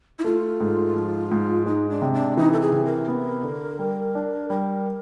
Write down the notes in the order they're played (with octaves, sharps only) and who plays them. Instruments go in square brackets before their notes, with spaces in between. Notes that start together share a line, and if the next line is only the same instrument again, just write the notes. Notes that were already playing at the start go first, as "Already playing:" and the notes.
[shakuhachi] E4
[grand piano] A3 [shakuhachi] F4
[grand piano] G#2
F3
G#2
[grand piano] G#3 [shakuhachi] D#4
[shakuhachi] D4
[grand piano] C3
[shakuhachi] D4
[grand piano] E3 [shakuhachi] D#4
[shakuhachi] A4
G#4
[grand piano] C3
[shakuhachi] A#4
[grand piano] B3
D3
G3
D4
[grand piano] G3 [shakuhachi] A#4